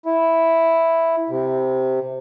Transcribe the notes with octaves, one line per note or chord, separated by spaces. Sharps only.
E4
C3